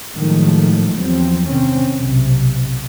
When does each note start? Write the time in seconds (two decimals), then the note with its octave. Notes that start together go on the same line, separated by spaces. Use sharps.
0.14 A2 D#3 F3 F#3 G#3 A3
0.95 E2 F3 F#3 C4
1.46 C3 D#3 C4 C#4
1.96 B1 C3